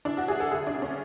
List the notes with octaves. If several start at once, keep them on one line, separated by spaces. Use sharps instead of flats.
E3 D4
F#4
F#1 G#4
A4
D2 G#4
D4
C#3
C#4